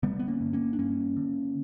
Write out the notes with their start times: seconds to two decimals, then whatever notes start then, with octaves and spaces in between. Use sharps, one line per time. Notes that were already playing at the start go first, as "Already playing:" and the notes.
0.03 D3 G3 B3
0.19 B3
0.28 A#3 C#4
0.41 G2
0.53 A#3 C#4
0.73 D4
0.79 G2 A#3 C#4
1.16 D3